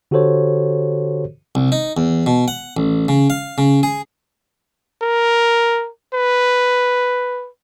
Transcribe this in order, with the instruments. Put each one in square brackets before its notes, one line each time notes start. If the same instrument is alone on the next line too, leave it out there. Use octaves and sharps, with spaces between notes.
[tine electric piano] D3 F#4 G4 A4 C5 C#5
[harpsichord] C2
D#4
E2
B2
F#5
A1
C#3
F5
C#3
G#4
[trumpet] A#4
B4